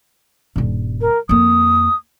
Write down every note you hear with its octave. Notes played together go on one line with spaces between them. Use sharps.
D#1 G2
A#4
F2 A#3 D#6